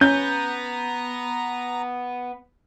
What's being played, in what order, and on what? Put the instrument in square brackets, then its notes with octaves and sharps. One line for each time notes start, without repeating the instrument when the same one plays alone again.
[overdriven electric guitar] B3 B4 [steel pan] C#4 [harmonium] A#5 [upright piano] G6